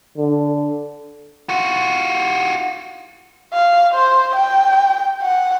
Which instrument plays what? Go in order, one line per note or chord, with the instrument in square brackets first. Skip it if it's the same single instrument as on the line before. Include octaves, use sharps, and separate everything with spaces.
[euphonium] D3
[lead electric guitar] F4 F#4
[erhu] F5
C5
G5
F#5